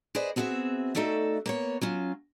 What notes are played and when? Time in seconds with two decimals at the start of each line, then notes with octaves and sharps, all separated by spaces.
0.15 G#4 B4 C5 D5 D#5
0.36 B3 C4 F#4 G#4 E5
0.95 A3 D#4 F#4 A4 D5 E5
1.46 A#3 B3 C#5
1.81 F#3 C#4 F4